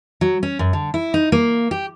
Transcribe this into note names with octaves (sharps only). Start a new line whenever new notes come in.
F#3
C#4
F#2
D3
E4
D#4
A#3
G4